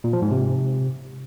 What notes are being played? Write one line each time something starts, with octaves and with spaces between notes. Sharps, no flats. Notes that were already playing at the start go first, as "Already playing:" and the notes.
A#2
F3
G#2
C3